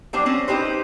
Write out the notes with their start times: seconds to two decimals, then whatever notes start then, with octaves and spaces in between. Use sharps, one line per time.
0.13 F#3 G3 D4 C5
0.26 C4 C#4
0.48 D#4 G4 B4 C5